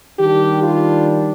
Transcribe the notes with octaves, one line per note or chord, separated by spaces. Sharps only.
D#3 G3 D4 G4
F4